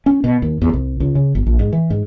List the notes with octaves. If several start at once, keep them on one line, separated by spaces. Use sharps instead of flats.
C#4
B2
D#2
E2
C2
C#2
C#3
G1
A#1
G#2
E3
G#2